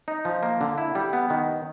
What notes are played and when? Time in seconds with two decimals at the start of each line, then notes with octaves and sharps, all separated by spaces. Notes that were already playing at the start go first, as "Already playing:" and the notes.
0.08 D#4
0.25 F3
0.43 A#3
0.61 D3
0.78 E4
0.95 G3
1.13 B3
1.30 D#3